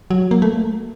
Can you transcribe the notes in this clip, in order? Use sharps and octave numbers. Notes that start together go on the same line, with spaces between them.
F#3
A#3
A3